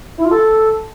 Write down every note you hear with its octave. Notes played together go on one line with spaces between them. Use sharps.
E4
F4
A4